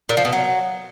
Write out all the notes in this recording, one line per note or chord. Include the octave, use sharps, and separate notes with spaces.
A#2
F3
B2
F#3